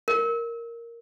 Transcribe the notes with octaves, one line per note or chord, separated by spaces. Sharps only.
A#4